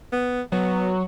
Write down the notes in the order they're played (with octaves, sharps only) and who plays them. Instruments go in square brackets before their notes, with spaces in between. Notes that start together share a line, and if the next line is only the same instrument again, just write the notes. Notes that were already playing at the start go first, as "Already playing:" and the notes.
[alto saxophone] B3
[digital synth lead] F#3 [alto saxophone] B3